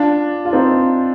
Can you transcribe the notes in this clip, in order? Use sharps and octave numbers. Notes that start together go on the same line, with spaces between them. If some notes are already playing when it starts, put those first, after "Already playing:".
Already playing: D4 F4
F4
C4 D#4